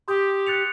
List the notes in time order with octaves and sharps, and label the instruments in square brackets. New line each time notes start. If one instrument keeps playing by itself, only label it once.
[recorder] G4 [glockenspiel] C6 D#6 G6
[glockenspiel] F#6 A6 C#7 F7